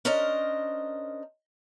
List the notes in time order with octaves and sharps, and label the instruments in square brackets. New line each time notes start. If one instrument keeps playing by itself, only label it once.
[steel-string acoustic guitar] C#4 D4 A#4 C5 D#5